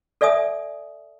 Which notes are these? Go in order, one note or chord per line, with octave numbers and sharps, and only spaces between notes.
A4 D5 E5 G#5 D#6